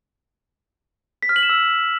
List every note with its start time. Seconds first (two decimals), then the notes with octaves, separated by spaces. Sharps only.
1.23 B6
1.29 F6
1.36 F#7
1.43 E7
1.49 E6